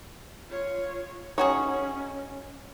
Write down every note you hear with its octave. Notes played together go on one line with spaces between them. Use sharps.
F4 C#5
C#4 D#4 F#4 G#4 C#5